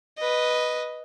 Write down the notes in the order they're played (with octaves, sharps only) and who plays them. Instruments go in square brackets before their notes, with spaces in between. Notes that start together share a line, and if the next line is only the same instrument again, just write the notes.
[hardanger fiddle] B4 D#5